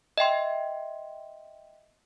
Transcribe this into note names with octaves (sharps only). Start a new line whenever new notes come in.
D#5 E5 G5 C6